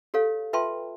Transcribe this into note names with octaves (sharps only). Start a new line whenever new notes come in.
G4 A4 C#5 F5
F4 B4 E5 G5 A5 C6